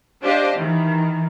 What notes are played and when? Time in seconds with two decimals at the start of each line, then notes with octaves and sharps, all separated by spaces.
0.23 D4 G4 C5 D#5 F5
0.59 D#3 E3